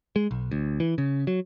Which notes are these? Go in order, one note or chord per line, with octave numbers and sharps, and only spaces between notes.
G#3
B1
D2
E3
C#3
F#3